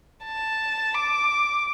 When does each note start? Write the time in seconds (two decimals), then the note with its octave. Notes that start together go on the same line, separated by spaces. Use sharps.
0.25 A5
0.94 D6